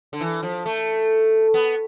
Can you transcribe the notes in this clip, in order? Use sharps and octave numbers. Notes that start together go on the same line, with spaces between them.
D3
E3
F3
A3
B3